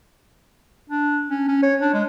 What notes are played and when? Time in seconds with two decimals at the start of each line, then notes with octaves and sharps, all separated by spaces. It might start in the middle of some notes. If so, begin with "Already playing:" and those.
0.90 D4
1.30 C#4
1.49 C#4
1.63 C#5
1.81 D4
1.94 G#3